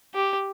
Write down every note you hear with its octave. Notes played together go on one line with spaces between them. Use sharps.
G4